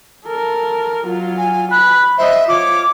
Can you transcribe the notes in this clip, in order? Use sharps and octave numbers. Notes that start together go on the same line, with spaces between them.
A4 A#4
F#3 F4
G#5
B5 F#6
C5 D#5 E5
F4 C#5 D6